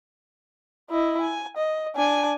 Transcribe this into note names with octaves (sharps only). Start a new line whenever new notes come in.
E4 D#5
G#5
D#5
D4 G#5